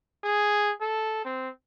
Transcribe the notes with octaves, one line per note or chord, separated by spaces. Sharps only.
G#4
A4
C4